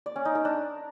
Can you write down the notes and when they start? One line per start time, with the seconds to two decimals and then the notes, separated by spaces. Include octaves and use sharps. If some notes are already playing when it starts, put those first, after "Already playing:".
0.06 D5
0.16 C#4
0.25 D#4
0.35 A#4
0.45 D4